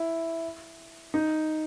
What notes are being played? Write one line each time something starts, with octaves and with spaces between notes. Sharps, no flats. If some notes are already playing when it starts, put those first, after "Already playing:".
Already playing: E4
D#4